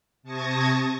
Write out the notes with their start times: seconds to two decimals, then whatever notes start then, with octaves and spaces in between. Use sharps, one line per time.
0.23 C3 A5 C#6 D#6 G#6 A#6